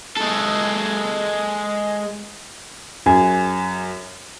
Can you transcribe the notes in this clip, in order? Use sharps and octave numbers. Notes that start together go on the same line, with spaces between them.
G#3 A4
F#2 G#4